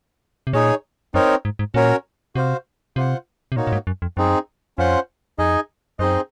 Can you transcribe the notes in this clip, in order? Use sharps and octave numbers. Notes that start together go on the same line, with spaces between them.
C3
A#2 D#4 G#4 C#5
F#2 C4 D#4 A#4 C#5
G#2
G#2
A#2 C#4 F#4 A#4 C#5
C3 F#4 C5 F5
C3 F4 C5 F#5
C3
A#2 A#3 D#4 F#4 C#5
A#2
G#2
F#2
F2
F#2 C4 D#4 G#4
F2 C#4 F4 C5 F#5
F2 D#4 G#4 D#5 G#5
F#2 C4 D#4 G#4 C5 D#5